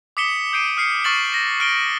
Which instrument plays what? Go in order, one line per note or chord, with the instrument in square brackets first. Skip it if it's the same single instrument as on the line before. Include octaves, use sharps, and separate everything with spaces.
[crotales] D6 D#6 B6 C#7 E7 G7
D#6 G6 C7 D7 D#7
D#6 F6 C7 C#7
C#6 F6 A6 E7 F#7
A#6
F6 D7 G7